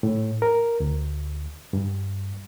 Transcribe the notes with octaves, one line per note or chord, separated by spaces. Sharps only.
A2
A#4
D2
G2